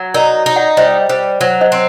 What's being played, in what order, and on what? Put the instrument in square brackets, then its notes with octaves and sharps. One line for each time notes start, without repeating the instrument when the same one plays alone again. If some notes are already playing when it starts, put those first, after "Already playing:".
Already playing: [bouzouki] F#3
[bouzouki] D#4 [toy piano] A#4 D5
[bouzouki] D#4
[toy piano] D5 F#5
[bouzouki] G3 [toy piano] C5 D#5
[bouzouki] G3 [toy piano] C5
[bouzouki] F#3 [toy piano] C5
[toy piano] C5 D#5
[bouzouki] C4